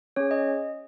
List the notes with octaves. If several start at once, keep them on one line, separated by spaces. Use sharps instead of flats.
C#4 G#4 C#5
D#5